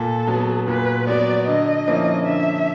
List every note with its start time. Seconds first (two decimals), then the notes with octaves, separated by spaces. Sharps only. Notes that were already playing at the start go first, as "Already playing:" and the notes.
Already playing: A#2 A4
0.27 F#3 B3
0.68 A#2 B4
1.07 F#3 B3 D5
1.47 D3 D#5
1.87 F3 A#3 C#4 E4
2.27 D3 E5